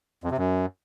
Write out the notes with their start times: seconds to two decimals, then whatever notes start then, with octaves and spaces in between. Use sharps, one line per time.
0.24 F2
0.31 C3
0.38 F#2